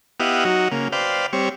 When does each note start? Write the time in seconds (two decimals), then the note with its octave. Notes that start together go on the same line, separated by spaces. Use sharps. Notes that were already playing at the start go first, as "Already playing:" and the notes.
0.20 B3 E4 G4 D#5 F5 F#5
0.45 F#3 D#4 F#4
0.72 C#3 A#3
0.92 B4 C5 D5 F5 G5
1.33 G3 C4 C#5